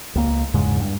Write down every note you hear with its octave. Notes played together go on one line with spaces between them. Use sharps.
C#2 A#3
E2 G#2 C#3 G#3
G2